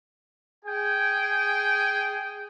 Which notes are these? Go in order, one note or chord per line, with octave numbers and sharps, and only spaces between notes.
G#4 G5 G#5